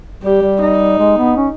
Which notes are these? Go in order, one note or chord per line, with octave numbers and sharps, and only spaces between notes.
G3 G4
G3
D#4
G#3
B3
C#4